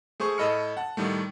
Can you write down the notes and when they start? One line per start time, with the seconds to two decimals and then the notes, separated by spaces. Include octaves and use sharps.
0.20 A3 G#4 C5 C#6 D#6
0.38 A2 A4 D#5 B5 F6 C#7
0.77 F#5 A5
0.97 A2 D#3 G3 A3